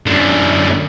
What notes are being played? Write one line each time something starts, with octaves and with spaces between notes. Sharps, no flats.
F#2 D3